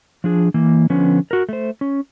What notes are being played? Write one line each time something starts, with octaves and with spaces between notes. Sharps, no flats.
F3 D4 G#4
E3 A#3
D3 F3 B3 C#4
F#4 A#4
A3 C5
C#4